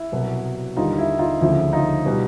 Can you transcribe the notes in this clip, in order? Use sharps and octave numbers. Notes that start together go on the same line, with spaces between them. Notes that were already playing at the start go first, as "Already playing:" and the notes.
Already playing: E4
C2 B2 F#3
D#2 D3 G3 D#4 F4
E4
D#4 F4
D2 C#3 F3 E4
D#4 F4
B2 G3